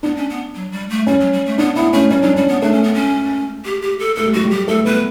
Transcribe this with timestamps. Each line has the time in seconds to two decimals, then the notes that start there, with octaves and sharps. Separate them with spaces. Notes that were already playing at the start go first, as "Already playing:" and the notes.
0.03 B3 D4
0.17 C#4
0.29 B3
0.55 F#3
0.72 G3
0.90 A3
1.07 G3 C#4
1.20 F#3
1.33 G3
1.46 A3
1.58 B3 D4
1.75 B3 E4
1.93 A3 C#4
2.10 G3 C#4
2.22 F#3 D4
2.34 G3 C#4
2.48 B3
2.62 A3 D4
2.72 C#4
2.83 B3
2.94 C#4
3.65 G4
3.82 G4
3.99 A4
4.16 A3 A4
4.26 G3
4.33 F#3 F#4
4.45 G3
4.51 G4
4.68 A3 A4
4.85 B3 B4